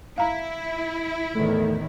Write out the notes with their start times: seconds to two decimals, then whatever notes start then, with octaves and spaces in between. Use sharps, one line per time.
0.18 E4 F5 A#5
1.35 E2 A2 D#3 A3